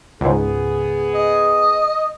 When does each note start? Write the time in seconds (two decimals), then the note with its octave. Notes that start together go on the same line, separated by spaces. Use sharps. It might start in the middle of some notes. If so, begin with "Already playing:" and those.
0.21 C#2 G#2 B3 G#4
1.14 D#5